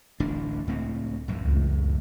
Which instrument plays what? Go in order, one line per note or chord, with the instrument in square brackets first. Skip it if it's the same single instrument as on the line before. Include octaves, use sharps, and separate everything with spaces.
[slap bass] D1 A1 D4
C#2 A2 C4
A1 F#2 A2
[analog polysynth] C#2